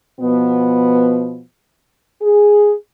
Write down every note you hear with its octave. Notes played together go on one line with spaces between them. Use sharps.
B2 F3 B3
G#4